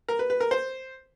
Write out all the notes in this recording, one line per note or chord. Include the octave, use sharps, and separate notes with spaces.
A#4
B4
B4
A#4
C5